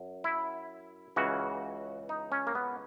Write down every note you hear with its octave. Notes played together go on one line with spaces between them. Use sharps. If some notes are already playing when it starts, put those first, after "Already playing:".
Already playing: F#2
E4
C#2 C#3 E3 F#4
D#4
C#4
A#3
B3